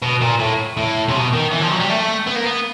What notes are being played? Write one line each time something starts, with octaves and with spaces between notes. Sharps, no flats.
B2
A#2
A2
A2
C3
B2
D#3
E3
F3
F#3
G3
A3
B3
A#3
B3